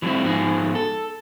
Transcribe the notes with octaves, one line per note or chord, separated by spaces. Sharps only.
E3 F#3 G#3 A#3 C4 E4
G#2 F3 B3 D#4 F#4 G#4
A4